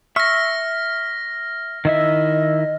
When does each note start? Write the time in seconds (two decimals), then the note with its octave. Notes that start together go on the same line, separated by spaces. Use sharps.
0.16 E5 C#6 E6 F6 A#6
1.85 D#3 E4 D#5 E5